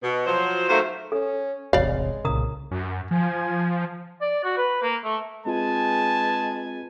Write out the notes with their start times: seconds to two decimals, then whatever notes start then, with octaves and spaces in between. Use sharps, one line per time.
0.03 B2
0.26 F3 F#3 C5
0.69 D#3 F#3 A3 A#3 A#4 C5
1.12 C#4 A4
1.73 E1 A1 C3 G#3 C#5 D5 F5
2.25 C2 A#2 C#3 A#4 A#5 D#6
2.71 F#2
3.11 F3 G#5
4.21 D5
4.44 F#4
4.57 B4
4.83 A#3
5.04 A3
5.46 G#3 C4 F4 G#4 B4 G#5 A5